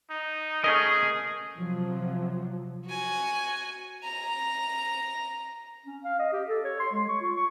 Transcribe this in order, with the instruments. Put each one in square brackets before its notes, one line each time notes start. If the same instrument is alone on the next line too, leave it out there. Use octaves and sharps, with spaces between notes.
[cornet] D#4
[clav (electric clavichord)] A3 C#4 A#4 [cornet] G#4 [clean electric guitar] D#5
[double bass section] C3 F3 F#3
[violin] F#4 G#5
A#5
[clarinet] C#4
F5
D#5
G4
A4
C#5
C6
G#3
C#6
F4
C#6